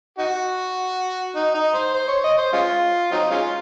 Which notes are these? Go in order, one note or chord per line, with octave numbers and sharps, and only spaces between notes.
D#4 F#4
D#4
D#4
C5
C5
C#5
D#5
C5
G#3 C#4 F4
F#3 C4 D#4
G#3 C#4 F4